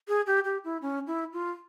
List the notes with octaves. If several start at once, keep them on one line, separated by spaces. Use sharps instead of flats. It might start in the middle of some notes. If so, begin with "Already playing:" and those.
G#4
G4
G4
E4
C#4
E4
F4